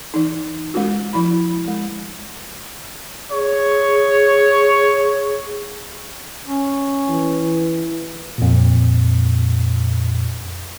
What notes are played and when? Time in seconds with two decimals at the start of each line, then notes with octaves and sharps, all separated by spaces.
0.14 E3 D#4
0.74 G#3 C#4 F4 F#4
1.13 F3 E4 B5
1.68 G#3
3.31 G#4 C#5
6.46 C#4
7.09 E3
8.38 F2 A#2